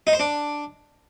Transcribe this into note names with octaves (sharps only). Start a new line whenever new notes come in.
D#4
C5
D4